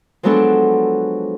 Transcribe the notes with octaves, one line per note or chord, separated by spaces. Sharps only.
F3 F#3 G#3 B3 D4 A4